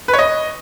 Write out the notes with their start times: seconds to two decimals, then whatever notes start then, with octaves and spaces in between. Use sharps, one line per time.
0.08 B4
0.13 C#5
0.19 D#5